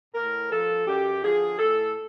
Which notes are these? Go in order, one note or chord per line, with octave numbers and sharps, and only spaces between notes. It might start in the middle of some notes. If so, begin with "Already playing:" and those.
A2 A#4
F3 A4
F#2 G4
D3 F3 G#4
A2 A4